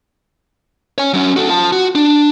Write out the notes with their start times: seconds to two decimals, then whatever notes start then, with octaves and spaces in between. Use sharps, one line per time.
0.98 C#5 G#5
1.13 F#3 C#4
1.36 F#4 A4
1.50 F4 A5
1.72 F#4
1.95 D4